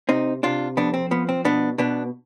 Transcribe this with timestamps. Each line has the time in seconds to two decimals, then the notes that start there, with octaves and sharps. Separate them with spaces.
0.09 C3 C4 D#4
0.43 C3 D4 F4
0.77 F2 B3 D4
0.94 C4
1.11 F3 B3
1.29 C4
1.45 B2 B3 D4
1.78 B2 B3 D4